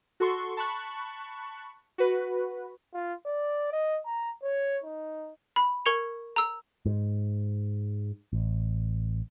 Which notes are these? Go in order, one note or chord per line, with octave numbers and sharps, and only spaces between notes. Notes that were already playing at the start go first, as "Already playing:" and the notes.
F#4 A4 C6 C#6
A5 B5 C#6 F#6
F#4 B4
F4
D5
D#5
A#5
C#5
D#4
B5
A#4 C#6 G#6 C#7 F7
A#5 E6
G#2
A1